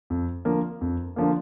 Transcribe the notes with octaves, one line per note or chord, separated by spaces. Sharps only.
F2
D3 F3 A#3
F2
D3 F3 A#3